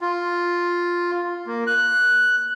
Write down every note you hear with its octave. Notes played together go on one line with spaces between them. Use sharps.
F4
A#3
F#6